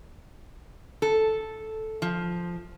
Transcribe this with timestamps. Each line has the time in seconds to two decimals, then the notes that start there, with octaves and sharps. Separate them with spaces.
1.02 A4
2.02 F3